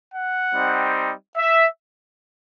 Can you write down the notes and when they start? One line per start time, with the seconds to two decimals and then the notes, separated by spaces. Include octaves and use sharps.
0.13 F#5
0.54 G3 C4 D#4
1.37 E5